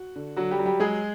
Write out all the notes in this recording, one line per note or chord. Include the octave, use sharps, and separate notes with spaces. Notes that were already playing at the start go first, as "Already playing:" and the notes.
Already playing: F#4
D3
D3 F#3 F#4
G3 G4
F#3
G3 G4
F#3 G#3 G#4